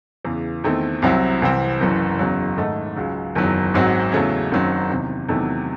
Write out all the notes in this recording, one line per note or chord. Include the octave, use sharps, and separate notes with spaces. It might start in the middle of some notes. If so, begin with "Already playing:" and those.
E2 C#3 E3
E2 D#3 A3 C4
C2 C3 F#3 C4 E4
C2 C3 E3 C4
F#1 F#2 E3
F#1 E2 C#3 F#3
G#2 D#3 A3 D#4
C#2 C#3 F#3
F#1 E2 D#3 F#3
G#1 G#2 F#3 C4 F#4
E2 C#3 F#3 A3 C#4
F#1 F#2 D#3 F#3 C4
E2 C3 D#3
E2 C3 D#3 F#3 A3